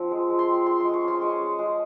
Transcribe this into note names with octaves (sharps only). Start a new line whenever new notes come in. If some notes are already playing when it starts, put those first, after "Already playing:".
Already playing: F3 C4
G#3
G#3
C6
C4
G#3 C6
G#3 C6
C#6
C#4 C6
G#3 C#6
G#3
G#3